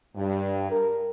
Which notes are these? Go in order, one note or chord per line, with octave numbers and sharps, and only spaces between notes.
G2
A#4